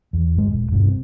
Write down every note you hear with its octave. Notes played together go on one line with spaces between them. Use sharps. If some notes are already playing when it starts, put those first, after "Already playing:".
E2
G1 G#3
D#1
G1 G2 B2
C3